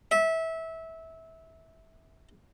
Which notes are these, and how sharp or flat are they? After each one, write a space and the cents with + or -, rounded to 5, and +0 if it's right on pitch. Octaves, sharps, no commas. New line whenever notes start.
E5 -20